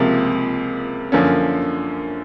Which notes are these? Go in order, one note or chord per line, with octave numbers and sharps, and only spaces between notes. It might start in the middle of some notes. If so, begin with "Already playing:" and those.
Already playing: C#2 C3 F3 A#3
F#2 D3 F3 A#3 C#4